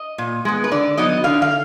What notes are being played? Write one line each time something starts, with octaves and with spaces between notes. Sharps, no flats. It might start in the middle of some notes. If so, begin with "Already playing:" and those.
Already playing: D#5
A#2
G#3 B3
B4
D3 D5
F#3 B3 D#4 D#5
D3 F5
F5